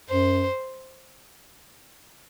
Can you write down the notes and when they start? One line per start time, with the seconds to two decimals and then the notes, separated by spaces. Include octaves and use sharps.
0.10 F#2 C5